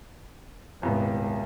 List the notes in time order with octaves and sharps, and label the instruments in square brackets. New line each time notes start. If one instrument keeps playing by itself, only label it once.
[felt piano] D#1 C2 B3 [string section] G#2